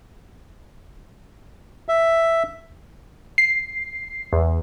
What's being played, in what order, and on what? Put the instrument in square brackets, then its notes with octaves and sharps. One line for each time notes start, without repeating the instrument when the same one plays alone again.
[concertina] E5
[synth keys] C7
E2